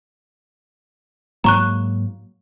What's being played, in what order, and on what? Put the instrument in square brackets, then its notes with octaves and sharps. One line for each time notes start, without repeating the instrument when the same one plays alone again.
[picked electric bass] G#2 F#3 A#3 [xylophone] A#5 C#6 F#6